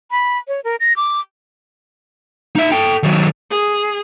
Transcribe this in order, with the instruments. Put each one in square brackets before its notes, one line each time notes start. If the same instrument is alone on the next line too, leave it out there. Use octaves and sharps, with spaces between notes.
[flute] B5
C#5
A#4
A#6
D6
[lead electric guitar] D#4 E5
A4 G5
D#3 F#3
[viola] G#4